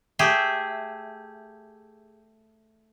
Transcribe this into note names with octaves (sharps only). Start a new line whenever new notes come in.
A3 G4 G#4 E5